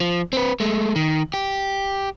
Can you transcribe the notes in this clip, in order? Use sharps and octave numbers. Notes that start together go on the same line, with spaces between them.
F3
C4 B4
G#3 A3
D#3
G4